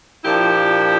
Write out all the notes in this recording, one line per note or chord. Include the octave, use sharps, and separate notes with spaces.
A#2 F3 A#3 D4 E4 G4